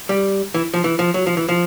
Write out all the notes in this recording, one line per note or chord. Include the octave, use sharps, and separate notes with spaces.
G3
E3
F3
E3
F3
F#3
F3
E3
F3